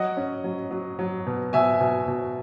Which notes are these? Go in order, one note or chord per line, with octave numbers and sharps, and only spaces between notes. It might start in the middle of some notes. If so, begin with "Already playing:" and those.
Already playing: F#3 D#5 F#5
C#4
F#3
F#3
F#3
B2
B2 E5 G#5
B2
B2